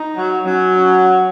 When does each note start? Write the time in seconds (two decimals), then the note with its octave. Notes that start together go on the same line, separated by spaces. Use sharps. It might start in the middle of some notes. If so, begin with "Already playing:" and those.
Already playing: D#4
0.16 F#3
0.45 F#3 C#4
0.74 C#4